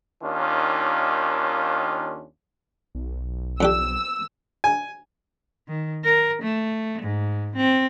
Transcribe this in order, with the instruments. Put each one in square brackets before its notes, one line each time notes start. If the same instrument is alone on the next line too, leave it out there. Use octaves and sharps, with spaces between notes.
[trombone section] D#2 D#3 C#4 D4 F4
[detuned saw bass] B1
[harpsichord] F2 D4 G4 [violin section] E6
[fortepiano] G#5
[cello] D#3
A#4
A3
G#2
C4